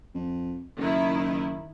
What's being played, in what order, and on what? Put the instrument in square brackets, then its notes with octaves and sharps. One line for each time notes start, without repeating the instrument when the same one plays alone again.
[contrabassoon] F2
[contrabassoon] F#1 [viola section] D#3 E4